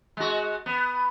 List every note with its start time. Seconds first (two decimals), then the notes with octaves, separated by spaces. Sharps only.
0.17 G#3 F#4
0.66 B3